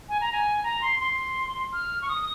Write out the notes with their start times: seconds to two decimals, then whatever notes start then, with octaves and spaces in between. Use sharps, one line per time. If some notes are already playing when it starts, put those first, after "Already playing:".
0.09 G#5
0.21 A#5
0.32 G#5
0.63 A#5
0.81 C6
1.00 C6
1.72 F6
2.02 C#6
2.09 D#6